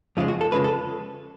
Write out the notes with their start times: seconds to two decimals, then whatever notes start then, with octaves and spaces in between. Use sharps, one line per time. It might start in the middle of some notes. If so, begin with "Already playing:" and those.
0.17 F2 C#3 F3 G#3 F4
0.28 F#4
0.41 A4
0.52 F2 C#3 F3 G#3 B4
0.64 A4